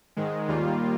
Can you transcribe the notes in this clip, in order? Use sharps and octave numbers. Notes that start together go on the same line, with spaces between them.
G#2 D#3 G#3
D#2 D#3 G3 A#3 F4